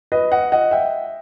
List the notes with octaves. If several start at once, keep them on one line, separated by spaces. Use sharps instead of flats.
B4 D#5
D#5 F#5
D#5 F#5
E5 G5